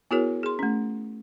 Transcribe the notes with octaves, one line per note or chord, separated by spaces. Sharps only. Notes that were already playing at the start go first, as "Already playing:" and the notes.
B3 E4 F#4 G#4 A#4 C#5
G#4 C6
A3 C#4